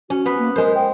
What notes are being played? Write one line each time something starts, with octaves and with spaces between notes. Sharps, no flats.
C#4 F#4
B3 B4
A#3
G#3 A#4 C5
G5